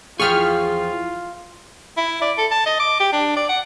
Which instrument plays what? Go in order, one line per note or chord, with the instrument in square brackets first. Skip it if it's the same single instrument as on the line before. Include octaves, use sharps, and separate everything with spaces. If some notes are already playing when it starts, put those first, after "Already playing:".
[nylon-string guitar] E2 F3 [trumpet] F4 [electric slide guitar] G#4 G5 [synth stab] C#6 F6
[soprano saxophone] E4
D5
A4
A5
D#5
D6
G4
D4
D5
F#5